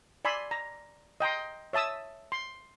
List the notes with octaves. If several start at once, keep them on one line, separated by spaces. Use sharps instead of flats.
D5 G#5 B5 C6 E6
A#5
D#5 G5 A#5 C6
C#5 E5 A5 D#6 E6
C6